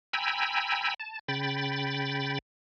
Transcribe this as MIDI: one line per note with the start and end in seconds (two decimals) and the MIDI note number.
0.13 0.94 79
0.13 0.94 80
0.13 0.94 82
0.13 0.94 83
0.13 0.94 88
1.00 1.19 81
1.28 2.38 49
1.28 2.38 79
1.28 2.38 83
1.28 2.38 93